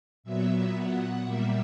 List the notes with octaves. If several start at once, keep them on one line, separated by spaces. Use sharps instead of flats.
A#2 F#3 B3 E5
F#5
A#2 G3 A#3 E5